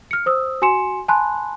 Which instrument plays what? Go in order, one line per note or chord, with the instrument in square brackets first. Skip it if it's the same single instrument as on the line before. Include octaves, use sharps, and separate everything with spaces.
[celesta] F6 C#7
C5 D#6 E6
F#4 G#5 C6 C#7 E7
G#5 A5 B5 C6 F#6